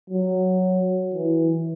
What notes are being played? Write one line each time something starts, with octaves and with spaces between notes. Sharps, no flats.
F#3
E3